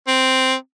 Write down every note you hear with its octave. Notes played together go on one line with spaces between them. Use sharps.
C4